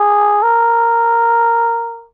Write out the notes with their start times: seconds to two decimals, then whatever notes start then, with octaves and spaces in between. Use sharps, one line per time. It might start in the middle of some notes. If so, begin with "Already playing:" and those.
Already playing: G#4
0.43 A#4